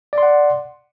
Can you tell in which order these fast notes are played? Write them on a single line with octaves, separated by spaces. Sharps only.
D5 C6 F#5